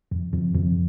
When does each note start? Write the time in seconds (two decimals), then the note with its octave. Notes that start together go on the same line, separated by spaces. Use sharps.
0.12 F2
0.34 F2
0.55 F2